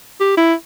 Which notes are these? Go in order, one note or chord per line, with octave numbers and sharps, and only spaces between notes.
G4
E4